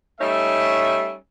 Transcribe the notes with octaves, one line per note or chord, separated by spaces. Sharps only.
G3 A3 C#4 D#4 E5